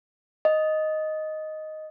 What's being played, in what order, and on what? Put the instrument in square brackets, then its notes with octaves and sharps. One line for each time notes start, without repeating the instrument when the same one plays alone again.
[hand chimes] D#5